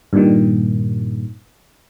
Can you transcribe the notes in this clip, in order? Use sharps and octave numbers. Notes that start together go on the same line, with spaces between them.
G2 A#2 D#3